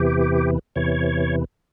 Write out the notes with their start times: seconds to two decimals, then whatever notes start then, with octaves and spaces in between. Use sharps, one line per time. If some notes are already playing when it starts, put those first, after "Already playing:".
Already playing: E2 C3 E3 G4
0.76 E2 C3 E3 C#5